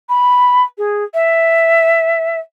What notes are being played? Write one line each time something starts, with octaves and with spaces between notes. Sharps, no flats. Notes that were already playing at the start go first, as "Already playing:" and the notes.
B5
G#4
E5